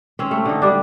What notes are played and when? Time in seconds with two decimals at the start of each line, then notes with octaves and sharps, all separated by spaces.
0.19 C4 C#4
0.31 A3
0.45 D3 D#4
0.62 G3 D4